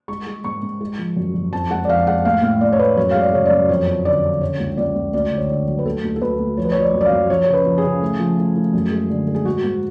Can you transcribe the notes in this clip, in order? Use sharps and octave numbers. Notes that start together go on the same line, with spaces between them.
G#3 C#6
G#3
G#2 C#6
G#2
G#3
F3
F#2
F#2
F2 A5
G#3 F#5
D5
F2 F5
G#3 F#5
A2 F5
A2 F5
A2 D5
C#5
A3 B4
F#2 C#5
G#3 F5
D5
C#3 C#5
D5
F#2
F2 C#5
F3
D3 D5
D3
C#3 C#5
C#2
C#2 D5
C#2
D2 D5
D3
C#5
D3
F#3
B4
D2 A4
D2
A4
D2 B4
D2
F3 C#5
B4
F3 C#5
D5
F#2
D5
F5
F#2
F3 C#5
C#3 C#5
B4
F3
G#4
C#3
A3
F3
A3
A3
F#2
G#3
D3
G#3
G#4
G#2 F#4
G#2